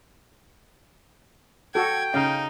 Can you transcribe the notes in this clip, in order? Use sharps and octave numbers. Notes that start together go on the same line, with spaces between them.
F#4 A4 G5 G#6
C#3 D#4 F5